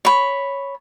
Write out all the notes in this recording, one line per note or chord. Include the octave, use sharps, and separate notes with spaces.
C#5 B5